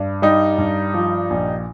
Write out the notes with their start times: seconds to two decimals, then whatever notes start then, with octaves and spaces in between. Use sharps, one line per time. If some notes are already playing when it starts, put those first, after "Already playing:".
Already playing: G2
0.22 G3 D#4 G4
0.58 G2
0.94 F3
1.30 A#1